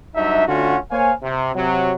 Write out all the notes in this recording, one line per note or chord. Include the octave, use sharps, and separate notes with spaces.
G2 F#3 D4 D#4 E5
D3 A3 C#4 F4 F#4
A#3 C5 C#5 F5 G#5
C3
C3 F#3